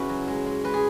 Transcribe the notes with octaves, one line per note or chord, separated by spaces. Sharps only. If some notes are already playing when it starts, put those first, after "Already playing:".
Already playing: C#3 C#4 E4 F#4 G#4 B4
F#3
G#3
G#3
G#3 B4
G#4